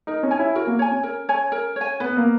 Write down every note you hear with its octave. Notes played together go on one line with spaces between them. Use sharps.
D#4 A#4
C#4
C#5 G#5
E4
F#4 A#4
A#3
C#5 G#5
C#4
A#4
C#5 G#5
A#4
C#5 G#5
B3 B4
A#3